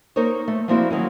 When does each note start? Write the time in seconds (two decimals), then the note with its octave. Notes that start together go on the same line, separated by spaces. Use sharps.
0.16 A#3 D#4 A#4 C5 C#5
0.48 A3
0.68 F3 G3 A#3 C4 E4 F#4
0.91 D#3 F#3 A#3 C#4